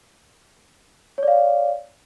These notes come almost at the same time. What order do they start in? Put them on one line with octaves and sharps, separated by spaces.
C#5 D5 F5